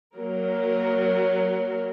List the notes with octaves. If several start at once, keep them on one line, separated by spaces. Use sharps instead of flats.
F#3 A#3 A#4